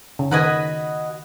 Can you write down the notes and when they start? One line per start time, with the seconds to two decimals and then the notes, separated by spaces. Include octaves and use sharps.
0.19 C#3
0.31 D#3 F#4 B4 D#5 G#5